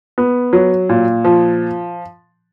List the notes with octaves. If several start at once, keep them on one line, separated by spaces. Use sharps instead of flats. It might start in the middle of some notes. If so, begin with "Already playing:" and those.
B3
F#3
A#2
F3